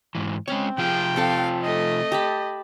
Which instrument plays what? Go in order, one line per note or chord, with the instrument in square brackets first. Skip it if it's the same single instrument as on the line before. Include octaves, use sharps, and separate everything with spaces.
[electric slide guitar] G#2 E3
[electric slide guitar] G#3 C#4 C#5 [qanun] C4
[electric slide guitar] C3 F3 F4 [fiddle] G#4 [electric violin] G5
[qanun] C4 A4 A5 [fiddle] F5
[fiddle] A3 [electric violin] D#5
[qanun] G4 A5 B5